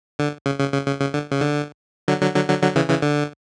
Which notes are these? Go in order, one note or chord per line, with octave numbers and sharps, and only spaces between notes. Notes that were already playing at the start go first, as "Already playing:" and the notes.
D3
C#3
C#3
C#3
C#3
C#3
D3
C#3
D3
D3 F#3
D3 F#3
D3 F#3
D3 F#3
D3 F#3
C#3 E3
C#3 E3
D3